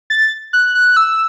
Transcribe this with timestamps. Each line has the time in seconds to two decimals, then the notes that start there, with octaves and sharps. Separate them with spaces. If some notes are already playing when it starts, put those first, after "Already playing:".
0.10 A6
0.53 F#6
0.75 F#6
0.97 E6